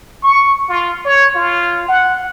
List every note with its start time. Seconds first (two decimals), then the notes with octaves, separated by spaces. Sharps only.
0.23 C#6
0.69 F4
1.05 C#5
1.35 F4
1.89 F#5